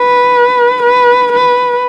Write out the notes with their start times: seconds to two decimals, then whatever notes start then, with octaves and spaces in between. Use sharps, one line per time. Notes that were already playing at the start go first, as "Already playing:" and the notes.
Already playing: B4
0.83 B4
1.33 B4